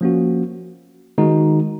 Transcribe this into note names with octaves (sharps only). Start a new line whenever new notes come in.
F3 A#3 C#4 F#4
D#3 G#3 D#4 F#4